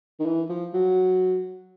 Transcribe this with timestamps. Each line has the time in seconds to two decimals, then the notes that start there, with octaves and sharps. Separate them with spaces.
0.20 D#3
0.25 E3
0.49 F3
0.74 F#3